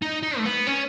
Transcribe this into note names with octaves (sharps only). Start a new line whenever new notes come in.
D#4
D#4
A3
B3
C#4